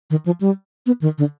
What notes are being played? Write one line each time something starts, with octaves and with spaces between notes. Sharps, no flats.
D#3
F3
G3
B3
D#3
D3